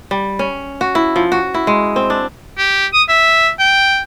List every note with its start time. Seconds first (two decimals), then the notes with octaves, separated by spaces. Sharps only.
0.11 G3
0.39 C#4
0.81 F#4
0.95 E4
1.16 F3
1.32 F#4
1.54 E4
1.67 G#3
1.96 C4
2.10 D4
2.58 G4
2.94 D#6
3.09 E5
3.59 G5